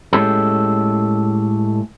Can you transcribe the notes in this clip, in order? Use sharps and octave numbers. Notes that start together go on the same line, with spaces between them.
A2 G#3 C#4 G4 A4